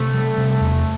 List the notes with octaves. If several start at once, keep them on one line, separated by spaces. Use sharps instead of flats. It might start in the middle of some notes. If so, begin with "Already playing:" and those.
Already playing: C3 A3
G3
C3
E2